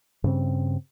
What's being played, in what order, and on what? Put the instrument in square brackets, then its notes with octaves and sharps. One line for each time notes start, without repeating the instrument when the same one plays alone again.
[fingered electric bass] G2 C#3 C4